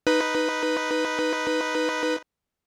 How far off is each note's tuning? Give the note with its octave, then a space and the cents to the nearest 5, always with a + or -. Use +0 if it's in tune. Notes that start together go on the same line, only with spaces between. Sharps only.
D#4 +0 B4 +0